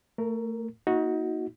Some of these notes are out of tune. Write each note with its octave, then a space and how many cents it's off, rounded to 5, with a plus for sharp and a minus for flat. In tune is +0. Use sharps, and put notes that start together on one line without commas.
A3 +30 A#4 +0
A#3 +25 D#4 +30 F#4 -10